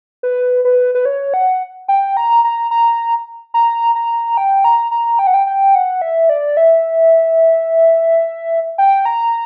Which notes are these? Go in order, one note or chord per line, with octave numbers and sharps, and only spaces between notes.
B4
B4
B4
C#5
F#5
G5
A#5
A#5
A#5
A#5
A#5
G5
A#5
A#5
G5
F#5
G5
G5
F#5
E5
D5
E5
G5
A#5